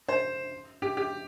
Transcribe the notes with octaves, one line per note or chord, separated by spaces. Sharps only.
C5
G4
G4